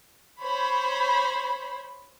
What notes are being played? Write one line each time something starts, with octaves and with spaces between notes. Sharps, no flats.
C5 C#5 B5